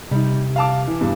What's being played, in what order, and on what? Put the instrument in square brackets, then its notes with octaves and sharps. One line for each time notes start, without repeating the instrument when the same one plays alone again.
[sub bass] C3 [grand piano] G3 D#4
[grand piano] F5 A5 D6
E3
E2 G2